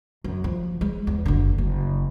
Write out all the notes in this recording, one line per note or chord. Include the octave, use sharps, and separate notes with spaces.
F#2
F3
G#3
E2
F#1 D3
F#1